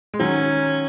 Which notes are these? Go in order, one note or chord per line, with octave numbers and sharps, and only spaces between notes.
G#3
D#3 F#3 C#4